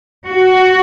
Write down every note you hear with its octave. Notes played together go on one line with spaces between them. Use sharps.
F#4